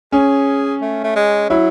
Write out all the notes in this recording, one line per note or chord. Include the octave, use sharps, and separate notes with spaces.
C#4 G#4
A3
A3
G#3
F#3 E4